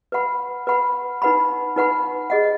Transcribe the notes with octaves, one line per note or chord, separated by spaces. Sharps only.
B4 F#5 B5
B4 F#5 B5
D#4 B4 F#5 B5
D#4 B4 F#5 B5
G#4 D#5 F#5